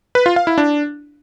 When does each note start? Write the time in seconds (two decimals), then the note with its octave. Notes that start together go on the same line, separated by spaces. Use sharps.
0.15 B4
0.26 F4
0.36 F5
0.47 E4
0.58 D4